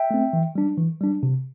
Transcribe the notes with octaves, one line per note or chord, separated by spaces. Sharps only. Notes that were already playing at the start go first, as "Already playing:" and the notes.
Already playing: E5 G5
A3 C4
E3
G3 D4
E3
G3 D4
C3